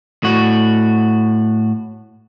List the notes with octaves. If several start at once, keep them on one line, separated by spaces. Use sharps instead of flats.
A2 F#4